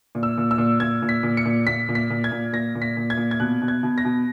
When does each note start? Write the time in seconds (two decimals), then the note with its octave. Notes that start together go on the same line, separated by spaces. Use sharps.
0.15 A#2
0.23 E6
0.37 A#2
0.51 E6
0.58 A#2
0.80 A#2 G#6
1.02 A#2
1.09 B6
1.23 A#2
1.37 C#7
1.45 A#2
1.67 A#2 B6
1.89 A#2
1.95 B6
2.10 A#2
2.24 G#6
2.31 A#2
2.53 A#2 A#6
2.75 A#2
2.82 B6
2.97 A#2
3.10 G#6
3.17 A#2
3.31 G#6
3.40 B2 F#6
3.62 B2
3.68 G#6
3.83 B2
3.98 A#6
4.05 B2